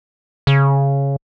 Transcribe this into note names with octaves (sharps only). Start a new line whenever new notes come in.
C#3